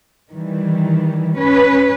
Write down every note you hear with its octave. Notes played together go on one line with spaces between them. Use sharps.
D#3 E3 G3
C#4 B4